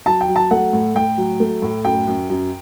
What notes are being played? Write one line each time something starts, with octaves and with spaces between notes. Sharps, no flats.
F#3 A5
G5
F#3
A5
A3 F#5
A2
A2 G5
F#3
A3
A2
F#2 G5
F#2
F#2